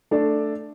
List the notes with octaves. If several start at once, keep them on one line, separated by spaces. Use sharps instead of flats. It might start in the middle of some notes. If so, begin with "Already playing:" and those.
A3 D4 A4 D5